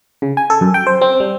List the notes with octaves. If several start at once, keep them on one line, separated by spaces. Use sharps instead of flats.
C#3
G#5
A4
F#2
G5
C5
C4
G3